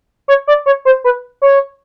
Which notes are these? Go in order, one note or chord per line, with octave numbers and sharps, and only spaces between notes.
C#5
D5
C#5
C5
B4
C#5